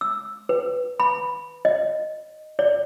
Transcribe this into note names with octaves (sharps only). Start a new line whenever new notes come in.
E6
B4
B5
D#5
D5